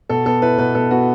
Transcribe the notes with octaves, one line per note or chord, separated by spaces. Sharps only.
B2 A4
B3 A4
E4 B4
B2 B4
B2 A4
B3 F#4